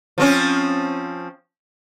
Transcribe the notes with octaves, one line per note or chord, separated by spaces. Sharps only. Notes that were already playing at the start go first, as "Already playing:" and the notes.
F3 C4 C#4